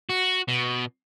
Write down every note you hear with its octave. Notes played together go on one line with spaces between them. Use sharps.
F#4
B2